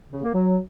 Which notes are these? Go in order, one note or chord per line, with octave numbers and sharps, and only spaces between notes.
C#3
A#3
F#3